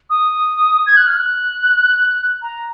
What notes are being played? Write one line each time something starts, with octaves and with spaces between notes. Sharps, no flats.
D#6
G#6
F#6
F6
F#6
A#5